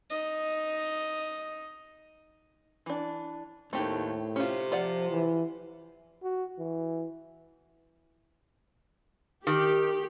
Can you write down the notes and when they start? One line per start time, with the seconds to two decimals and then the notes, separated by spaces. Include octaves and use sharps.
0.10 D#4 D#5
2.86 E3 D4
3.73 D#2 A2 A3 C4 G4
4.36 C3 C#4 F4
4.72 F3 F4 D5 F#5
5.11 E3
6.23 F#4
6.59 E3
9.47 D#3 G4